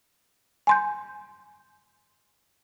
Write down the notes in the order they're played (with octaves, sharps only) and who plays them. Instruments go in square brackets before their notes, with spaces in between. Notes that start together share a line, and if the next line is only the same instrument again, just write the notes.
[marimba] G#5 C6 G6